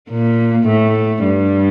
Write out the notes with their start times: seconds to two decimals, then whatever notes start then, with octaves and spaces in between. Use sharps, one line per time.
0.10 A#2 A#3
0.68 A2 A3
1.24 G2 G3